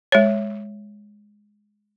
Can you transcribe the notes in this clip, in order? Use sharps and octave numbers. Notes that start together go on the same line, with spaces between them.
G#3 C#5